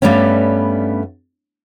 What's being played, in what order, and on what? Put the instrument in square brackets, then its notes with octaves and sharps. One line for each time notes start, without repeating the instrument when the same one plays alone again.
[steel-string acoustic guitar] G2 G3 A3 B3 C#4